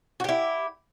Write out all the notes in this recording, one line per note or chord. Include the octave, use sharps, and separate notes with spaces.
E4 F#4 G4